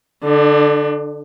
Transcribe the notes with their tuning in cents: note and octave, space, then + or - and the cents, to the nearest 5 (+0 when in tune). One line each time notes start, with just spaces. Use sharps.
D3 +0 D4 +40